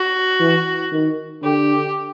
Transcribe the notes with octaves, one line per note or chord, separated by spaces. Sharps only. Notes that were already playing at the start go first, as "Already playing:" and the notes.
Already playing: F#4
E3
D#3
D3 G4